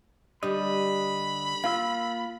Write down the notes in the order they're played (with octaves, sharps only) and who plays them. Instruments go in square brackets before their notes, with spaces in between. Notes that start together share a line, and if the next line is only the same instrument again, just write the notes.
[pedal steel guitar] D3 D4 D#5 [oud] G3 [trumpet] B5
[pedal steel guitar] A#3 F4 E6 [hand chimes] F5